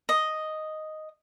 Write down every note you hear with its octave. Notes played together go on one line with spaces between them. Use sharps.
D#5